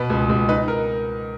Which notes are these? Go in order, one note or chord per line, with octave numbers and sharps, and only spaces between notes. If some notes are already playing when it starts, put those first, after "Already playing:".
Already playing: B2 B4
C#2
C#2
D#4 B4
A#4